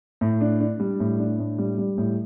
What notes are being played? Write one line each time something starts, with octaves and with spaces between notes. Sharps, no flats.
A2
D4
D4
G3
A2
D4
A2
G3
G3
A2